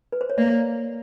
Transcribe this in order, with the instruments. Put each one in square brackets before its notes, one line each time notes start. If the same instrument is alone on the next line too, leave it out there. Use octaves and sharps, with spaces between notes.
[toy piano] B4
C5
C#5
[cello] A#3 [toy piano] D5